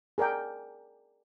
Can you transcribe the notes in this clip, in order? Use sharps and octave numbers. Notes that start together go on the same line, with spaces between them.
G#4 A#4 D5 G5